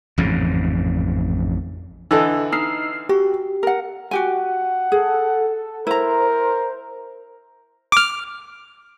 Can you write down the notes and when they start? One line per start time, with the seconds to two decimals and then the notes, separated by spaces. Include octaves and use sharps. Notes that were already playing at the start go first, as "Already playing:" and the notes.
0.18 A1 F2 G#2 C#3
2.11 D3 E3 E4 A4 D#5
2.52 D#4 E6 F6 C7
3.09 F#4 G4
3.63 A#4 F#5
4.11 F#4 G4 F#5 G#5
4.92 G#4 A4
5.87 E4 A#4 C5 A#5
7.92 D6 F6